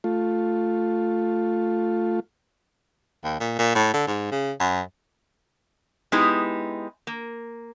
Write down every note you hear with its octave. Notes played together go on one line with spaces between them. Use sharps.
A3 F4
D#2
A#2
A#2
A2
D3
G#2
C#3
F#2
G#3 B3 D#4 E4 G4
A#3